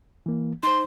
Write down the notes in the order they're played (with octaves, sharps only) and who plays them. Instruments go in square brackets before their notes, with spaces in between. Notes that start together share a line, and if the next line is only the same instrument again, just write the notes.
[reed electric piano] E3 A#3
[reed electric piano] D#4 C5 [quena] C6